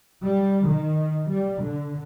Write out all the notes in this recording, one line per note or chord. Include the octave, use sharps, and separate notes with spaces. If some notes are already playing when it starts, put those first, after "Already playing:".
G3
D#3
G3
D3